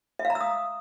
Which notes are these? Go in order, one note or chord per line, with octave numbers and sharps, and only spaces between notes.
E5
F5
A#5
E6
D#6